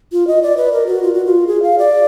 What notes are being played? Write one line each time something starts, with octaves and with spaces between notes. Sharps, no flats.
F4
D#5
D5
B4
A#4
F#4
F4
F#4
F4
G#4
F5
D5